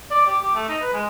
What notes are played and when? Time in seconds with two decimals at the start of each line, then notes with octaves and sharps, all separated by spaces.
0.11 D5
0.27 G4
0.42 G4
0.55 A3
0.68 D#4
0.82 B4
0.93 G#3